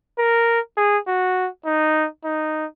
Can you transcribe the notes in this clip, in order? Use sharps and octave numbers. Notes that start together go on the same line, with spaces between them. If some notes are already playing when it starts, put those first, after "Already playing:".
A#4
G#4
F#4
D#4
D#4